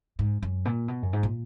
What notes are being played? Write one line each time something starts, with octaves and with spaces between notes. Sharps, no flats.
G#2
F#2
A#2
B2
F#2
G#2
A#2